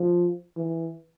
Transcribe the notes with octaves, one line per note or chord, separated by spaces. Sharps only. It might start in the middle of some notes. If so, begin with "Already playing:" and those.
Already playing: F3
E3